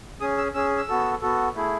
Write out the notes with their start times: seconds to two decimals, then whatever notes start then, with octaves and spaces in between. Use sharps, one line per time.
0.21 C#4 G#4 D#6
0.38 E6
0.54 C#4 G#4 E6
0.78 E6
0.89 B3 F#4 A4
1.22 B3 F#4 A4
1.55 A3 E4 G#4